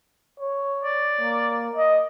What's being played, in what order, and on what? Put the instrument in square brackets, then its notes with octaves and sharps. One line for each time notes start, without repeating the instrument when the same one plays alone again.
[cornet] C#5
[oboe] D5
[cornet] A#3
D#5